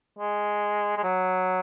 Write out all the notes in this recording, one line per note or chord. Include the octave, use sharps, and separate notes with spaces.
G#3
G#3
F#3